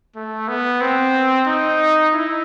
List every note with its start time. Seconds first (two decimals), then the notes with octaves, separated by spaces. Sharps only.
0.16 A3
0.48 B3
0.81 C4
1.47 D#4
2.14 E4